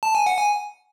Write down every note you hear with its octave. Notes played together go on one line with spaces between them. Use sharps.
A5
G#5
F#5
G#5